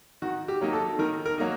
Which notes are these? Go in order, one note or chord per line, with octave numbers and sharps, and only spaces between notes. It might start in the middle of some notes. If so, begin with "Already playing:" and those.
D#3 F#4
G4
F#3 A#3 D#4
A4
D#3 A#4
A#4
F#3 A#3 D#4